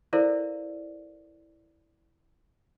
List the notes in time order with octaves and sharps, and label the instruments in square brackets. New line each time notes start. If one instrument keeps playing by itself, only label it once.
[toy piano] E4 A4 A#4 C5 D5 F5